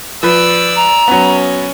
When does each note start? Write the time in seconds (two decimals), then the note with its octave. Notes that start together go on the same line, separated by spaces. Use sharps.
0.23 F3 B4 D5 E6
0.76 A#5
1.08 F#3 B3 C#4